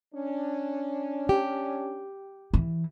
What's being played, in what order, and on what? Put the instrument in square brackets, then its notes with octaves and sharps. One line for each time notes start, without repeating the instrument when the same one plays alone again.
[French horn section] C#4 D4
[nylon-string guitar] G4
[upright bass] E3